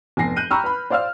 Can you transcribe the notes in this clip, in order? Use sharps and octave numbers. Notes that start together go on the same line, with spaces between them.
F1 B3 G#5 A#6 C7
F#6 G6 D#7
G5 A#5 B5 C#6 E6 F6
B4 B5
C5 D5 F5 E6 F6